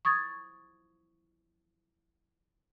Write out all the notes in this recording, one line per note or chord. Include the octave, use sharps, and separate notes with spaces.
C#6 D#6 G#6 A6